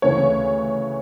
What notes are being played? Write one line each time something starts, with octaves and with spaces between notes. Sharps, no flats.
D2 C#3 E3 C#5